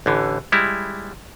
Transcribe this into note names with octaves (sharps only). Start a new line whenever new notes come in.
A1 D3 E3
G3 G#3 E4